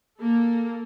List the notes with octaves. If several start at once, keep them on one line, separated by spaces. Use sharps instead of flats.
A#3 A4